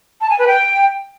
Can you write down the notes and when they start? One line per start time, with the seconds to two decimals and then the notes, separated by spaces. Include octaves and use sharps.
0.21 A5
0.30 G#5
0.39 B4
0.47 G5